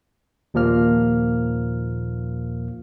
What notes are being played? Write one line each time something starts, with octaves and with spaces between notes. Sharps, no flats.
D#2 A#2 F3 A#3 F6